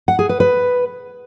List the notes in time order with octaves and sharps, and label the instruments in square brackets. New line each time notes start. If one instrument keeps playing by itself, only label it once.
[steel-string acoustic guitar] F#5
G#4
B4
B4